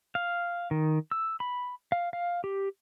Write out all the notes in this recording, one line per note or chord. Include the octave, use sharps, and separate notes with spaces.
F5
D#3
E6
B5
F5
F5
G4